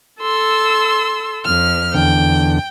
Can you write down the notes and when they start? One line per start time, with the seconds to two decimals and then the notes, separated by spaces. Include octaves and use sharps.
0.21 A4 C6 E6
1.45 F2 F6
1.94 E2 D3 G5